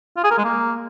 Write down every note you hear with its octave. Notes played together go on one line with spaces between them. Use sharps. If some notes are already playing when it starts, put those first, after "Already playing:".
F4
G#4
A#4
G#3
A#3